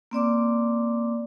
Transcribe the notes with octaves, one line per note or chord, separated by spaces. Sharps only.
A#3 C4 D5 D6